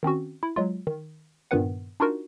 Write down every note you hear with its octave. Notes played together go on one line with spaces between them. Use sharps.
D#3 C4 C#4 F#4
E4
F#3 G#3 F4
D#3
G2 A#2 D#3 B3 B4 F#5
D4 D#4 F4 F#4 A#4